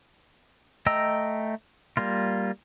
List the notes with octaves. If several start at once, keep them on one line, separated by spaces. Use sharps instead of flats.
A3 D#5 G5 A#5 E6
G3 A#3 F4